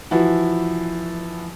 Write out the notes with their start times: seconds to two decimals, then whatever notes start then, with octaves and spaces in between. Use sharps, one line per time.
0.11 E3 F3 E4 F#4